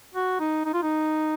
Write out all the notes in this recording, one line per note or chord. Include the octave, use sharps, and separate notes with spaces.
F#4
D#4
D#4
F4
D#4